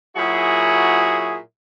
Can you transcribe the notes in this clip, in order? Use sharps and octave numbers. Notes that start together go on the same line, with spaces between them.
A#2 F#3 E4 F#4 G#4